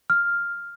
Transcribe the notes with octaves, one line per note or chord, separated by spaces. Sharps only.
F6